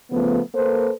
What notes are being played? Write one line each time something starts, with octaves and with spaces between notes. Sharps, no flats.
C#3 F3 A3 B3
A#3 A4 B4 C5